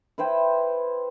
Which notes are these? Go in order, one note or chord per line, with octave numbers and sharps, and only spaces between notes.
E4 B4 C5 G5